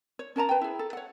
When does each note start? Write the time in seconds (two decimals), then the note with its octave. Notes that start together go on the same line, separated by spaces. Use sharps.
0.19 C#5
0.36 C#4 A#4 A5 A#5
0.49 B4 G5
0.61 E4 G#4
0.79 A4
0.93 C#5 F#5